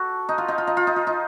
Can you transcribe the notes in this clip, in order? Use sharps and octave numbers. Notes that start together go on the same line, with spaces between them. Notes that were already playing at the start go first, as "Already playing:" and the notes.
Already playing: F#4 A4
D#4
F4
D#4
F4
D#4
F4
D#4
F4
D#4